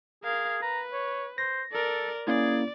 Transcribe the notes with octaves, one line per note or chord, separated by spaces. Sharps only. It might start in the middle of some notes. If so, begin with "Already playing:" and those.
G#4 A#4 F5
B4 A#5
C#5
C5 A#6
A4 A#4 D5
A#3 C#4 E4 G#4 D5